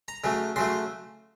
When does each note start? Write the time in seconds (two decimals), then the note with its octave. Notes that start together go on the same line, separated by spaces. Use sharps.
0.08 A#5
0.24 C#3 F#3 A3
0.56 C#3 F#3 A3 C6